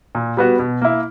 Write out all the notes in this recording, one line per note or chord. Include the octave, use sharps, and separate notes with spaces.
A#2
G3 B3 F#4
B2
A#3 E4